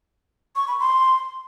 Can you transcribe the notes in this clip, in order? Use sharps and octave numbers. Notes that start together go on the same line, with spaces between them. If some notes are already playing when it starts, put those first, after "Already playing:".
C#6
B5
C6